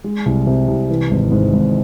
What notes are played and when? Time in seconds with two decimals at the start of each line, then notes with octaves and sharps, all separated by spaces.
0.04 G#3
0.26 C2
0.47 C3
0.68 C2
0.90 E3
1.11 G#1
1.32 G#2
1.53 G#1